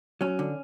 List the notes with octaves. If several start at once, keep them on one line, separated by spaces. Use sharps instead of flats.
F#3 C#4
D3